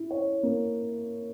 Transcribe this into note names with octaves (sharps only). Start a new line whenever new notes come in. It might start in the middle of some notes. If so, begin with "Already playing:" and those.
Already playing: E4
C#5
A#3